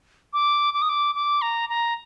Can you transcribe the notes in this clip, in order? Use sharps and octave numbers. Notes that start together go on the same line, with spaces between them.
D6
D6
D#6
D6
D6
A#5
A#5